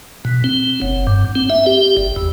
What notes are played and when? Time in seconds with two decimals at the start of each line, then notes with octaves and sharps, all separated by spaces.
0.25 B2
0.44 C4
0.82 F#1
1.07 G2
1.35 C4
1.50 E5
1.66 G4
1.97 G1
2.16 E2